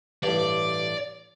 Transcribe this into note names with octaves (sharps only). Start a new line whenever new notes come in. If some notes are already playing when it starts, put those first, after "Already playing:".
A1 G2 D5